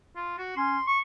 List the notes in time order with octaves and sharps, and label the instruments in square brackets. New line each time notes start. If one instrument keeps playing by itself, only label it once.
[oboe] F4
F#4
[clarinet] C#4 [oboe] C6
[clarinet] C#6